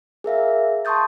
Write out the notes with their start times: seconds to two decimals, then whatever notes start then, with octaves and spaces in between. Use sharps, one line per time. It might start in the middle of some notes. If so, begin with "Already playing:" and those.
0.24 G#4 A#4 E5 F5
0.85 A5 C6 C#6 D#6 G6 A6